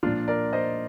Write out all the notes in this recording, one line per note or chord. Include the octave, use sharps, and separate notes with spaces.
A#2 F3 D4 F4
A#4 D5
C5 D#5